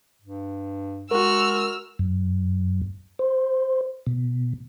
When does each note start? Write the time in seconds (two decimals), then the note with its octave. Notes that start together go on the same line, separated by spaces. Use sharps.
0.22 G2
1.11 G#3 F#4 A#4 E6 F6
1.99 F#2
3.19 C5
4.07 B2